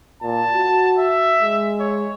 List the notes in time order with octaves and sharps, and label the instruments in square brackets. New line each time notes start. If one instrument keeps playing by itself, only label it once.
[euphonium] A#2 [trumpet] A5
[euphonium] F#4
[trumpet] E5
[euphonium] G#3
[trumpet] C#5